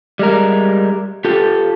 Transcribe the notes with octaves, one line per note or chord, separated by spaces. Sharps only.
G3 G#3 A#4
F4 G4 A4